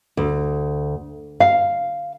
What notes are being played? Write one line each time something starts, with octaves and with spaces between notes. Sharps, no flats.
D2
F5